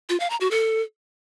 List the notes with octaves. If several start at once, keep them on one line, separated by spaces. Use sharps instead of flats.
F4
F5
A#5
F#4
A4